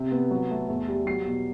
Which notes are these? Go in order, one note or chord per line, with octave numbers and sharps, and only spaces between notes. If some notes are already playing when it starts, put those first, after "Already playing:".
Already playing: C3
B3
F#3
A3
E2
G3
F#3 C7
B2